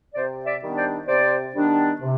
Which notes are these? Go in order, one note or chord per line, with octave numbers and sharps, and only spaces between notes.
C3 C5 D5
D5 E5
D#3 G3 B3 D4
C5 D5
C3 C5 D5
D#3 G3 B3 D4
C3